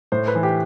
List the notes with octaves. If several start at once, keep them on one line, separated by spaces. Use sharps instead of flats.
A2 C5
B4
E3
G4